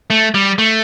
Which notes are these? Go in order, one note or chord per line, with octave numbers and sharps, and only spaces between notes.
A3
G3
A3